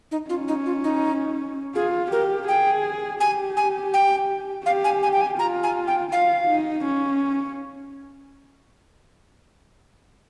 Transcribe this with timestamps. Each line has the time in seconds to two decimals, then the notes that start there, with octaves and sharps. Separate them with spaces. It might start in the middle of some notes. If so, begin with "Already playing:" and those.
0.11 D#4
0.29 C#4 F4
0.48 D#4
0.66 F4
0.84 D#4
1.75 F4 G#4
2.12 G4 A#4
2.48 G#4 G5
3.20 G4 G#5
3.57 G#5
3.94 G5
4.66 G4 F5
4.84 G#5
5.03 G#5
5.13 G5
5.21 G#5
5.39 F4 A#5
5.63 G#5
5.87 G5
6.11 F4 F5
6.48 D#4
6.85 C#4